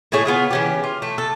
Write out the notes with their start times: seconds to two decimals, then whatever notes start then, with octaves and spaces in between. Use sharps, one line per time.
0.12 A2 E4 G#4 C#5
0.25 B3 F4 G#4
0.51 E3 C#4 G4
0.84 F4
1.02 A3
1.18 A4